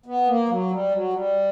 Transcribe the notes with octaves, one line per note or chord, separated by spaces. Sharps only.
B3
A#3
F#3
G3
F#3
G3